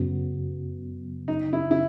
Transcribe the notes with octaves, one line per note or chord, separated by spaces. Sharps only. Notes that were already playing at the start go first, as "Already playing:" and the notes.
Already playing: F#2 C#3 F#3 B3
D#4
E4
E4